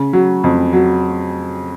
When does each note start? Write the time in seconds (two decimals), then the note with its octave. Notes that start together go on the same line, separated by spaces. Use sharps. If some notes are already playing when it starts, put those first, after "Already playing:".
Already playing: C#3
0.13 F#3
0.44 F2
0.73 F#3